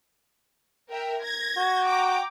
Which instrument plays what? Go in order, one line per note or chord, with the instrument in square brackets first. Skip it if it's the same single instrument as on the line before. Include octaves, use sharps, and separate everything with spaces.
[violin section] A#4 E5 G5
G#6 A#6
[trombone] F#4
[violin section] G5 A#5 D6